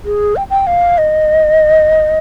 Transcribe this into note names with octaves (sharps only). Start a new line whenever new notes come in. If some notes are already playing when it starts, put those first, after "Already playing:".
G#4
G5
G5
F5
D#5